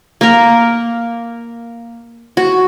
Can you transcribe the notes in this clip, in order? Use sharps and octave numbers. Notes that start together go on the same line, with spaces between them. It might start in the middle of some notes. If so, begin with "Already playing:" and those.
A#3 A#4
F#4